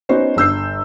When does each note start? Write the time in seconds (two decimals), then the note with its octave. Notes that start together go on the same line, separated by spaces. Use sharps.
0.09 B3 C#4 D#4 F#4 C5 C#5
0.36 G1 E6 G6 C7